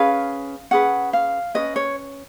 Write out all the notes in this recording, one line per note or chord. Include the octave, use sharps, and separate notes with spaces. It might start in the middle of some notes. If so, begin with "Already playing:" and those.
Already playing: C#4 G#4 B4 F5
C#4 G#4 B4 F#5
F5
C#4 F#4 B4 D#5
C#5